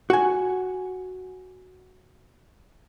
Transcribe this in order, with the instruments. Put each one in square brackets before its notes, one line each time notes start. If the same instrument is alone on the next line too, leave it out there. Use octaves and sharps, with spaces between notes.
[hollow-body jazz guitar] F#4 G#5